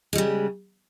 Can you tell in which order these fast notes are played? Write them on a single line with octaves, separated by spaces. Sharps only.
G#3 G3 C#3